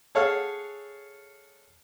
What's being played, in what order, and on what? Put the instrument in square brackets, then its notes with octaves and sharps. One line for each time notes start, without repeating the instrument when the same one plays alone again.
[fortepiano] G#4 A4 C#5 F5 F#5